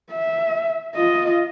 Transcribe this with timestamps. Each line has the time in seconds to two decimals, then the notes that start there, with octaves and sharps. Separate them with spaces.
0.12 E5
0.95 F4 D#5